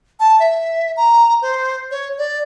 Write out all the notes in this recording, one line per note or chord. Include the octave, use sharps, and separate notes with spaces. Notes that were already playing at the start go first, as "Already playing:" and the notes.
A5
E5
A#5
C5
C#5
D5